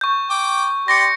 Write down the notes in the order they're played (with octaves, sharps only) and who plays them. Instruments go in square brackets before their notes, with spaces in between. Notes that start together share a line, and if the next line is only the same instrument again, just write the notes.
[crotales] C#6 G6
[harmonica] G5 D6
[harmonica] G4 D5 C6 [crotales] A#6 C#7